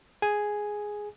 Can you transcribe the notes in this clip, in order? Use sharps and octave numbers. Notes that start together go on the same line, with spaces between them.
G#4 G#5